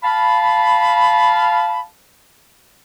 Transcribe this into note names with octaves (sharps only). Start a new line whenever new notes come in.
F5 A5 B5